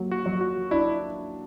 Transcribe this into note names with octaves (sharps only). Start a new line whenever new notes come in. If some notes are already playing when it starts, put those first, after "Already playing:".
Already playing: F#3 A#3
F#4
F#3
F#4
D4 E4